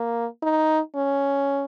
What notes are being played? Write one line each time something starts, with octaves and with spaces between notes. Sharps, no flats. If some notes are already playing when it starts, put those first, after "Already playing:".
Already playing: A#3
D#4
C#4